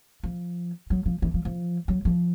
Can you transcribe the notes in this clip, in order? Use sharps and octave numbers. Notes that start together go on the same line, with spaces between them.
F3
F#3
F3
E3
F3
F3
F#3
F3